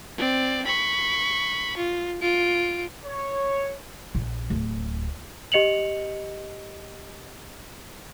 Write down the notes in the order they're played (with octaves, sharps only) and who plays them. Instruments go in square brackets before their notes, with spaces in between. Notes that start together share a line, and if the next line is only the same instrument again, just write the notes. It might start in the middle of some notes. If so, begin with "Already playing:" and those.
[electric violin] C4 D5
B5 C#6
F4
F4 D7
[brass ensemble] C#5
[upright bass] A#1
D1
[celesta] G4 D#5 C#7 F7 F#7